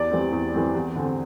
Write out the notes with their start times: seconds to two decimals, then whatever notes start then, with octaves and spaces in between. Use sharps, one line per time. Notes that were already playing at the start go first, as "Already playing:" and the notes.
Already playing: E2 D5
0.11 E3 G3 C4
0.32 E2
0.54 E3 G3 C4
0.75 E2
0.95 D3 C4